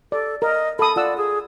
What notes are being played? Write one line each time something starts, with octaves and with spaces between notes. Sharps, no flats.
A4 D5
A#4 D#5
A4 B5 D#6
F4 D5 F#5 E6
G#4